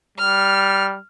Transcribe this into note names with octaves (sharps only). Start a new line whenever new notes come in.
G3 F6